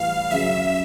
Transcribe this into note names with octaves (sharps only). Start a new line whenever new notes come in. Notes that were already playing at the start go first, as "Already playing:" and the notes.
Already playing: A2 E3 G3 F5
F#2 C#3 F#3 E5